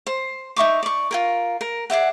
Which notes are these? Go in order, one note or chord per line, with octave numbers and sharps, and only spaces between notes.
C5
D#4 E5 C#6 D6
D5 C#6
F4 G#4 A#4
A#4
G#4 D5 E5 F#5